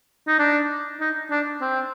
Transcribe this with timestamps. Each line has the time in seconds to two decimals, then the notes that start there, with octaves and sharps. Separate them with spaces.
0.28 D#4
0.39 D4
1.00 D#4
1.31 D4
1.61 C4